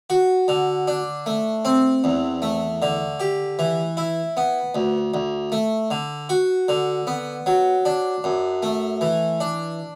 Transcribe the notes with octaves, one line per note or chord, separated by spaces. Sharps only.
F#4
D3
D4
A3
C4
E2
A3
D3
G4
E3
E4
B3
D2
D2
A3
D3
F#4
D3
B3
F#3
D4
F#2
A3
E3
D4